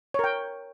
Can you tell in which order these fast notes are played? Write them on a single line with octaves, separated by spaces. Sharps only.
C#5 A#4 G5